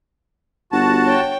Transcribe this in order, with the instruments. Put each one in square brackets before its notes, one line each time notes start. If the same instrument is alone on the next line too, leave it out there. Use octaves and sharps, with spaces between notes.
[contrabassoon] G1 [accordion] F#4 A5
[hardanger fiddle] C#5 G5